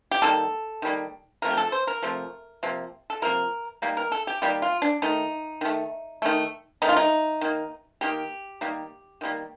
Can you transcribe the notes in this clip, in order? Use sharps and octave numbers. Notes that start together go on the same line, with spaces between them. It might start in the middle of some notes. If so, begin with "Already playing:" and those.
G4
D#3 G3 A#3 A4
D#3 G3 A#3
C3 F3 A3 A#4
G4
A4
C5
A#4
C3 F3 A3
C3 F3 A#3
A4
C3 F3 A#3 A#4
D#3 G3 A#3
A#4
A4
G4
D#3 G3 A#3 G4
F4
D4
D#3 A3 D#4
D#3 A3
D#3 A3
D#3 A3 D#4
F4
D#4
D#3 A#3
D#3 A#3 G4
D#3 G3 A#3
D#3 G3 A#3